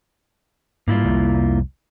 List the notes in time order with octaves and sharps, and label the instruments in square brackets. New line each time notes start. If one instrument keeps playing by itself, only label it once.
[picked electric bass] G#2 G3 [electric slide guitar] A#3 E4 F4
[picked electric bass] F1 C2 G3